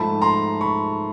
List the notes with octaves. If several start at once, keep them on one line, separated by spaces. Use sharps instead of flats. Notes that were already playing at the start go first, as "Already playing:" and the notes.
Already playing: G#2 F3 A3 A5 B5
A#5 C6
B5 C#6